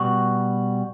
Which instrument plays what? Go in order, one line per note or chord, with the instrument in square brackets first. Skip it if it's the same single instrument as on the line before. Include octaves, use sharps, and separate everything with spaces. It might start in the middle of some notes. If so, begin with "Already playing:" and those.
Already playing: [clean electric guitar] B2 G3 F#4